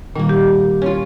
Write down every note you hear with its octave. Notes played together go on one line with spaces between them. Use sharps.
A#2 D#3 G3 A#3
G4
C#4 F4